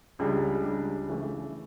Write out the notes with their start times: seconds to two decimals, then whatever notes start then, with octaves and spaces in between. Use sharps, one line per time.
0.19 C#2 C#3 G3 D4
0.63 C#2 C#3 G3 D4
1.08 C#3 E3 A3